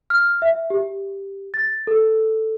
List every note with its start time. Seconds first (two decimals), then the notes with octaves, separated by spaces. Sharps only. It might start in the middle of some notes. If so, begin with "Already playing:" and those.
0.10 F6
0.42 E5
0.70 G4
1.54 A6
1.87 A4